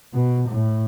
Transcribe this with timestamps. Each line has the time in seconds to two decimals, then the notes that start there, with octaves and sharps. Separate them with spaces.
0.14 B2
0.49 A2